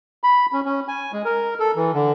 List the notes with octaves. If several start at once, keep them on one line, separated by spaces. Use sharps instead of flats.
B5
C#4
C#4
G#5
G#3
A#4
A4
E3
D3